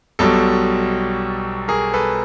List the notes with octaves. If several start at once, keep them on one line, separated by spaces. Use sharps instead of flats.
B1 B2 G3 A4
G#4 A#4
A4 B4